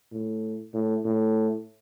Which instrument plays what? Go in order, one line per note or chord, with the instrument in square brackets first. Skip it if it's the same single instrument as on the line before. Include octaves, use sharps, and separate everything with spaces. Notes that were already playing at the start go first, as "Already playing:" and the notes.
[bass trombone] A2
A2
A2